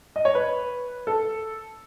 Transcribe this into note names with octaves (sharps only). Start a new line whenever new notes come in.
D#5
C#5
B4
A4